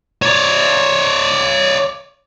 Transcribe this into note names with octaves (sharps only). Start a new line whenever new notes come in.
C#5 D5